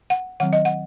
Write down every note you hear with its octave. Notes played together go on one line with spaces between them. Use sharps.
F#5
D#3 F#3 C4 F#5
D#5
F#5